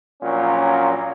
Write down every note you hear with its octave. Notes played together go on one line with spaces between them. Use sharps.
A#1 A#2 F#3 C#4